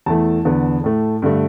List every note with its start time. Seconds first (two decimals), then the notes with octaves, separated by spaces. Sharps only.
0.06 E2 E3 A3 A5
0.45 E2 D3 B3
0.84 A2 A3
1.22 G2 D3 A3